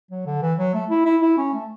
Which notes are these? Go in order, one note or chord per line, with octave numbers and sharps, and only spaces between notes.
F#3
D3
E3
F#3
A3
E4
E4
E4
C#4
A3